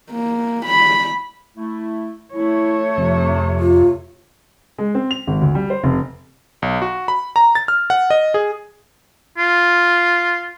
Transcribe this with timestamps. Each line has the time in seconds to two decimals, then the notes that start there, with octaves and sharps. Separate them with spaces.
0.10 A#3
0.65 B5
1.57 A3 E4
2.34 A3 E4 C#5
2.98 F2 C3
3.59 F4
4.78 G#3
4.95 C4
5.11 F7
5.27 G#1
5.41 D2
5.55 G3
5.70 C5
5.84 F1
6.62 B1
6.82 F#4
7.08 B5
7.36 A#5
7.55 A6
7.68 F6
7.90 F#5
8.10 D#5
8.34 G#4
9.38 F4